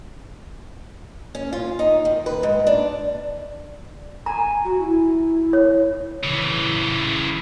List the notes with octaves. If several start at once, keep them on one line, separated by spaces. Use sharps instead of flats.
C#4
F4
D#4
D#3
B4
G#2
D4
G#5 A#5
F#4
E4
C#5
C#3 E3